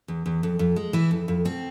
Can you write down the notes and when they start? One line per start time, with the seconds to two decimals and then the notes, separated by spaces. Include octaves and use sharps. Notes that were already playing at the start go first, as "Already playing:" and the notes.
0.08 E2
0.26 E2
0.43 F2
0.59 F2
0.76 G#3
0.93 E3 E4
1.11 F2
1.28 F2
1.45 B2 C4